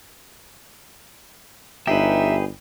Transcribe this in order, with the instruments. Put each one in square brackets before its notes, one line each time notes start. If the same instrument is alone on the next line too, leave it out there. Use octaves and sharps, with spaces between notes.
[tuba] G1 [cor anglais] D#4 [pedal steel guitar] G4 G#4 B4 [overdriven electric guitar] E5